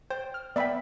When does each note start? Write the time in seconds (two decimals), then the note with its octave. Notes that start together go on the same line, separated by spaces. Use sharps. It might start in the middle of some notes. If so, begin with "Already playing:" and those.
0.10 C5 G5
0.34 F6
0.56 B3 D5 E5 G5 B5